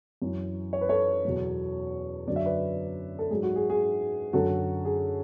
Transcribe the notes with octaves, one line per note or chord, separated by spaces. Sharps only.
F#2 E3
C#5
B4
A4 C#5
E2 B2 F#3
F#2 D3 F#3 D5
E5
B4 D5
A4
G#2 F#3 G#4
F#4
G#4
G#4
F#2 D3 F#3 F#4 A4
G#4